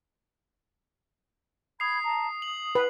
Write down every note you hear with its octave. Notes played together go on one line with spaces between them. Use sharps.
B5 D#6 G#6 C7
A5 A#5
D#6 F#7
B4